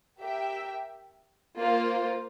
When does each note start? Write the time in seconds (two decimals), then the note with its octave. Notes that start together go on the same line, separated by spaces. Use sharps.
0.20 G4 A#4 E5 G5
1.58 A#3 F4 C5